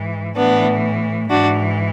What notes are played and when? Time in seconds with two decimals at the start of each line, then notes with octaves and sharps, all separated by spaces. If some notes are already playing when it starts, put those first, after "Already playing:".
Already playing: G#2 E3
0.36 A2 E3 B3 D4
1.30 G#2 E3 D4 F#4